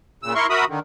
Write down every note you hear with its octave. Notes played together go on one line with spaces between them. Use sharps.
A#2 C#3 E6
E4 A#4 C6 C#6
F#4 A#4 E5 B5 D#6
D3 D#3